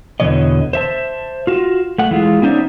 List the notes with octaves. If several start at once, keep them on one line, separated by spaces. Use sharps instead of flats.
E2 B2 D3 E3 C#5 D#5
C5 E5 A5
F4 F#4
A3 F#5
E3 G#3 F4
B3 C#4 D#4 C5 D5 E5